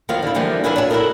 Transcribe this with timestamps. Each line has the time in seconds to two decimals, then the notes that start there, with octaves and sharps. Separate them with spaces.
0.09 D#2 D#3 F3 E4 F4 F5
0.22 D3 E4
0.35 D3 E3 F3 G3 A#3
0.64 D4 E4 G#4 B4 E5 F5
0.76 D4 C#5 E5 F5 G#5
0.90 E4 F#4 G4 A4 A#4 D#5